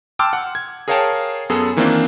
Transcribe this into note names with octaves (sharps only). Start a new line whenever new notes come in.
G5 A5 C6 D6 E6 F6
F#5
G#6
G#4 A#4 C#5 F5 G5 A5
F#2 B3 G#4 A4
D#3 E3 A#3 C4 D4 F4